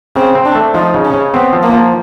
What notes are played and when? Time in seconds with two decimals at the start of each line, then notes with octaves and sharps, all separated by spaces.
0.16 C#3 C4
0.35 C4
0.45 D4
0.55 A3
0.74 F3 D#4
0.94 C#3
1.05 C#4
1.14 C#3
1.34 B3 C4
1.53 F3
1.63 A#3
1.73 F3